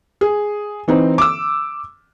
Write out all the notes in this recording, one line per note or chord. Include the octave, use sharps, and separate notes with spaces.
G#4
E3 C4 D#4
D6 E6